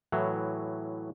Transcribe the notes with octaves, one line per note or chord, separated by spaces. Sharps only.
A2 E3 F#3